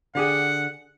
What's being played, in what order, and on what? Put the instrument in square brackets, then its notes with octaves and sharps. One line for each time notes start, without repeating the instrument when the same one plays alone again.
[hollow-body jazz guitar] D3 G4 G#4 [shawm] F#5